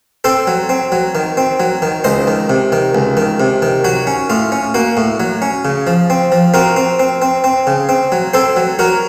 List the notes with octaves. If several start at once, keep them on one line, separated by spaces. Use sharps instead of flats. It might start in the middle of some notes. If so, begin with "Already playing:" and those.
C4 A4 C5
F#3
C4
F#3
D#3
C4
F#3
D#3
C#2 C5 D#5
D#3
C3
D#3
C#2
D#3
C3
D#3
F#3 F#4
C#4
A2 F4
C#4
A#3 F#4
A2
F#3
C#4
C#3
F3
C4
F3
C4 F#4 A#4
C4
C4
C4
C4
C#3
C4
F#3
C4 A4 C5
F#3
F#3 F#4 A#4